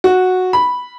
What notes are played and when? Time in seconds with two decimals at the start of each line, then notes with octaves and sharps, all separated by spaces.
0.04 F#4
0.53 B5